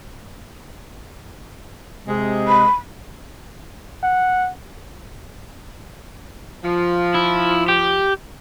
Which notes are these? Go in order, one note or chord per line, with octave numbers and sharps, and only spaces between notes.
C3 G#3
B5
F#5
F3
E4
G4